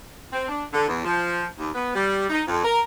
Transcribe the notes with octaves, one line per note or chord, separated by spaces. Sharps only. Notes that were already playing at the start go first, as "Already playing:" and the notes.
C4
D4
D3
E2
F3
D#2
B3
G3
D#4
F2
A#4